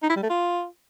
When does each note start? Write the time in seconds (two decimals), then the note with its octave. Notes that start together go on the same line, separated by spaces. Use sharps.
0.03 D#4
0.09 E4
0.16 G3
0.23 A3
0.29 F4